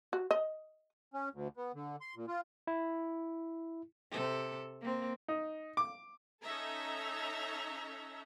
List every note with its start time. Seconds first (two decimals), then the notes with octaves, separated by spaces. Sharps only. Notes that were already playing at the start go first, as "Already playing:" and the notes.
0.13 F#4
0.31 D#5
1.14 C#4
1.33 D2
1.57 B3
1.75 D3
2.01 C6
2.16 A#2
2.28 F4
2.67 E4
4.12 C3 A4
4.81 A#3 C4
5.28 D#4
5.77 D6
6.43 C#4 D#4 A4 E5 A#5